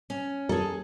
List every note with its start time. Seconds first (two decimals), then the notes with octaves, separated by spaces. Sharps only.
0.10 C#4
0.49 G#4 A4